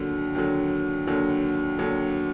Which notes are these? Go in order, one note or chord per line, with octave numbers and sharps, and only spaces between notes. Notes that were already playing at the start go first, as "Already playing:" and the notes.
Already playing: D#2 D3 F#3
D#2 D3 F#3
D#2 D3 F#3
D#2 D3 F#3